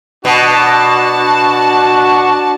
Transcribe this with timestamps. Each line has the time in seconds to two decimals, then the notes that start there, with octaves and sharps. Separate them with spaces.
0.25 B2 D4 F#4 A5